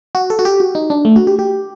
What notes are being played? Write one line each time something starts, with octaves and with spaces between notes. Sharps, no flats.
F#4
A4
F#4
G4
F#4
D#4
D4
A3
F#4
G4
G4